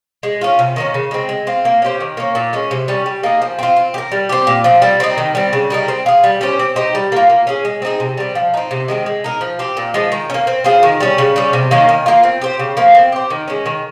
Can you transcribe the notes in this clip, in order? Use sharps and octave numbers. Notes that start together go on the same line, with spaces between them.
G#3
C#4 F4
C3
D#3 A#3 C#4
C#3
G#3 C4
G#3
C4 F4
A#3
C#4 G4 C5
D#3
A#3 C#4
A#2
G#3 C#4
C3
G3 C#4
G3
A#3 D#4 G#4
F3
C4 F4
C4
G4
A#4
G3
C4 G4
A#2
F3 C4
G3
C4 D#4
D#3
G3 C4
C#3
G3 A#3 D#4
C4
F4 G#4
G3
C#4 G4 C5
C4
D#4 G4 C5
G3
A#3 F4
A#3
C#4 G#4
G#3
C4 D#4 G#4
C3
G3 C4
F3
C4 D#4
C3
D#3 G#3 C4
G#3
D#4 A#4
F3
C4 G4
A#2
F3 G#3
D#3
C#4
A#3
C4
F4 G#4 C5
D#3
G3 C#4
C#3
G3 C#4
C3
D#3 A#3 C#4
D#3
A#3 F4
C4
G4 C5
C#3
F3 A#3
C4
G4 C5
D#3
G#3 C#4
D#3